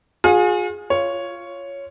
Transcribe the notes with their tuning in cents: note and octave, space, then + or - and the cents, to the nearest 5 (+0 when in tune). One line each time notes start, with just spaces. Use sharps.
F4 +45 G#4 +0
F4 -10 C#5 +0